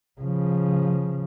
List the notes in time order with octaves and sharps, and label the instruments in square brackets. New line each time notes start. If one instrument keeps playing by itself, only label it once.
[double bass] C#3 F3